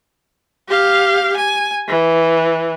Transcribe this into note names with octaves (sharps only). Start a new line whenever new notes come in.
G4 F5
G#5
E3